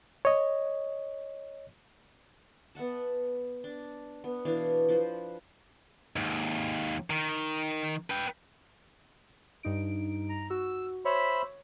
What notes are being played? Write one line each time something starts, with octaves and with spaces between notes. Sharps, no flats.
C#5 D#5
B3 E5 F#5 A5
D4
B3
B2 E3 D4 F5
F3 B4 C5
D#2 G#2
D#3
B4 G5
G2 D#4 D7
A#5
F#4 E6
C5 C#5 E5 B5